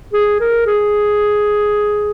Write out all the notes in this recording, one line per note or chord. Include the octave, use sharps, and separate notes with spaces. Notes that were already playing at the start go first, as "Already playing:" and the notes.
G#4
A#4
G#4